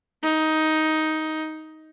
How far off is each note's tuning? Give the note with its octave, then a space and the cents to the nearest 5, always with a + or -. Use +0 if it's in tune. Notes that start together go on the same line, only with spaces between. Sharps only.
D#4 +10